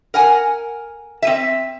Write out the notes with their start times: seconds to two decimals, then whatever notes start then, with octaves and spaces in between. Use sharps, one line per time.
0.14 A#4 F#5 G#5
1.22 C4 E5